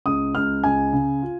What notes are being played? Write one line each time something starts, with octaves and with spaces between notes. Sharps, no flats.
C#2 D#6
C#2 F6
C#2 G#5
C#3
F4